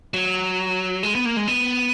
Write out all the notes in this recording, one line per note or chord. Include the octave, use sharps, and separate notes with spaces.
F#3
G#3
B3
A#3
G#3
B3